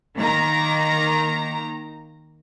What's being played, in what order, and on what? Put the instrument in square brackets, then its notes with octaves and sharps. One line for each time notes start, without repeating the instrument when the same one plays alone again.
[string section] D#3 A#3 A#5